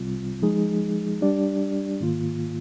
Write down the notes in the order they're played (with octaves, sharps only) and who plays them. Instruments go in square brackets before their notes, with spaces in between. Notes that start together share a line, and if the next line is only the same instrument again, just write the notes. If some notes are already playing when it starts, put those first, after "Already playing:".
Already playing: [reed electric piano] C2 C3 G3 C4 F4
F3 G#3 D#4 G#4
G3 D4 G4 D5
G#2 D#3 A#3 F4